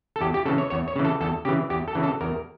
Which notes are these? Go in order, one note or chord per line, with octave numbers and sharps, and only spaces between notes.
A4
E2 G4
G4
C#3 E3 A4
C#5
E2 C#5
C#5
C#3 E3
A4
E2 A4
C#3 E3 G4
E2 G4
A4
C#3 E3
A4
E2 A#4